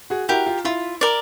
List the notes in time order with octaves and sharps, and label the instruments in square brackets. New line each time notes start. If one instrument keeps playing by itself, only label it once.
[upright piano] F#4 G#4
[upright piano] E4 F#4 [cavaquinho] G4 A#4
[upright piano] F4
[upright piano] E4 [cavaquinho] F4
[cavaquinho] A#4 D5